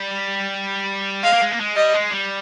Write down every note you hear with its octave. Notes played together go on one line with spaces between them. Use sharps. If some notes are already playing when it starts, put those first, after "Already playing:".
Already playing: G3
G#3 F5
A#3
G#3
A#3
G#3
G3 D#5
G#3
G3